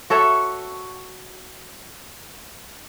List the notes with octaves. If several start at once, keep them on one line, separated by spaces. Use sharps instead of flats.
F#4 A4 C#5 E5